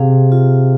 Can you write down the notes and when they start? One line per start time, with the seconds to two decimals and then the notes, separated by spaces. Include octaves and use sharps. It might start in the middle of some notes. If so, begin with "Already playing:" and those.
Already playing: C3 G#4 F5
0.32 F4